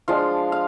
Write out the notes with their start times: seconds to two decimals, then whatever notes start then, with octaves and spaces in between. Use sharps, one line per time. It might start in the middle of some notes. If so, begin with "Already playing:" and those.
0.08 F3 G#3 D4 F4 F5
0.52 F5